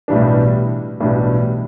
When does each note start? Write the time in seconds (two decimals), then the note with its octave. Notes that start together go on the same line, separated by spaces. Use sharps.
0.08 B1 A2 E3 G3 D4
1.00 B1 A2 E3 G3 D4